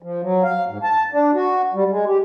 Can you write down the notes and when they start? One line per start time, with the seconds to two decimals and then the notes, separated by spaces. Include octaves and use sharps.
0.02 F3
0.22 F#3
0.43 F5
0.68 G#2
0.83 A5
1.12 D4
1.35 F#4
1.74 G3
1.90 G#3
2.07 G4